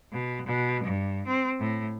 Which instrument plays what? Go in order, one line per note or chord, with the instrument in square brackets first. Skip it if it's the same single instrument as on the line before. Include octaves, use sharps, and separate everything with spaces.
[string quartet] B2
B2
G2
C4
A2